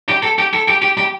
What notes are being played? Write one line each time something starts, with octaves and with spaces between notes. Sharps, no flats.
G4
A4
G4
A4
G4
G4
G4